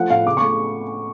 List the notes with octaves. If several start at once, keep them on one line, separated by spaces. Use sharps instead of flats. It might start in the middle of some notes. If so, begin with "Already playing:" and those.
Already playing: F3 A3 F#5
A2 F5
C#3 D6
C#6
A3